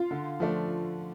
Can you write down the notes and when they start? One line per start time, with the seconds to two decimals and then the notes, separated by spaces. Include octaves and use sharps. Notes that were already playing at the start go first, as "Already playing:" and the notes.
Already playing: F4
0.11 D3
0.40 F3 A3 D4